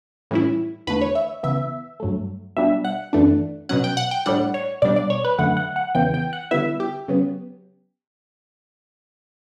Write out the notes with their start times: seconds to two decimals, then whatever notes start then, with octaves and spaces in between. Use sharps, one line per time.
0.31 A2 E3 G3 C#4 E4
0.87 E2 D3 A3 B4
1.01 C#5
1.15 E5
1.43 C#3 E3 B3 E5
2.00 G2 F#3 A3
2.57 B2 G3 D4 E5
2.85 F#5
3.13 F#2 E3 A3 D4
3.69 B2 F#3 C#4 F#5
3.84 G5
3.97 F#5
4.11 G5
4.26 A2 G3 D4 F#5
4.54 C#5
4.82 B2 G3 D4 D5
4.96 D5
5.10 C#5
5.24 B4
5.38 F#2 D3 A3 F#5
5.57 F#5
5.76 F#5
5.95 E2 C#3 E3 B3 G5
6.14 G5
6.33 F#5
6.51 D3 G3 B3 E4 E5
6.80 G4
7.08 C#3 F#3 B3